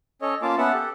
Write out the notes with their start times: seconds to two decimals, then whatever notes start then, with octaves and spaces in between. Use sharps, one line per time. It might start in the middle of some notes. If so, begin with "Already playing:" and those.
0.22 C#4 A4 C#5 D#5
0.42 A#3 C#4 F4 A5 D6
0.58 B3 C#4 B4 E5 F#5 A5
0.73 G4 A4